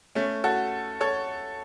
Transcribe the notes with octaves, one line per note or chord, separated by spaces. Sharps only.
A3 C#4
F#4 A4
A4 C#5